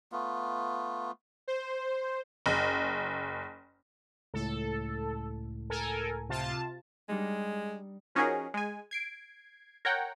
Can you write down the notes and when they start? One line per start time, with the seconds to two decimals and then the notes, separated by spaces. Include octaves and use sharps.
0.12 A3 B3 F4
1.48 C5
2.46 F#1
4.34 C#2 A2 A4
5.70 A4 A#4 G#5
6.29 C3 F4 A5
7.09 G3 G#3 D4 D#4
8.15 F3 C#4 D#4 F#4 G#4 A#4
8.54 G#3 G#5
8.91 G#6 C7 D7
9.85 A#4 C#5 F#5 G5